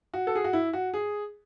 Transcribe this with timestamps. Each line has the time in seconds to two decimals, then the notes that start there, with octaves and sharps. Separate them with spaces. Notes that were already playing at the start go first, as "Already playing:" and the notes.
0.14 F#4
0.27 A4
0.35 G#4
0.44 F#4
0.53 E4
0.73 F#4
0.94 G#4